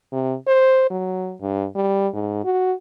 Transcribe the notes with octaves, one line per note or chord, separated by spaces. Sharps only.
C3
C5
F#3
G2
G3
G#2
F#4